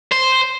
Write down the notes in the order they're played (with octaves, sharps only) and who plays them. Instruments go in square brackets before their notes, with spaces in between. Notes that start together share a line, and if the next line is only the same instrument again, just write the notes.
[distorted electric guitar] C5